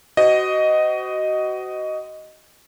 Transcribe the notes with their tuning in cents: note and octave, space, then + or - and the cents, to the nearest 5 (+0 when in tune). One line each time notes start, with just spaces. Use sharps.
F#4 +25 C5 -30 D#5 +0